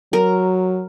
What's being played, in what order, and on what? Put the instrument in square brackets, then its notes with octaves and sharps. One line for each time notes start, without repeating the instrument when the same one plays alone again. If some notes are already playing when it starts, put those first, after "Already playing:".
[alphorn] F#3 [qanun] A#4